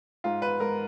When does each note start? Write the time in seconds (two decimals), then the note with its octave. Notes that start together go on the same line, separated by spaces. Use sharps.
0.24 G#2 F4
0.42 B4
0.60 G#2 A#4